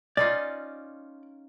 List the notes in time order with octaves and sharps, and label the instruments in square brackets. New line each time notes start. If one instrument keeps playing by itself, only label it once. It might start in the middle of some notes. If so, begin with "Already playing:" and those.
[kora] C#4 D#4 F4 [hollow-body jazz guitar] D5